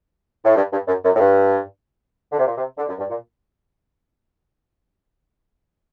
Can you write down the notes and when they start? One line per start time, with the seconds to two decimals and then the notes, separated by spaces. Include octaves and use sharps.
0.44 A2
0.56 G2
0.71 G2
0.87 F#2
1.03 F#2
1.15 A2
1.19 G2
2.32 D3
2.38 C3
2.45 A#2
2.56 C3
2.77 D3
2.88 F#2
2.98 G2
3.09 A#2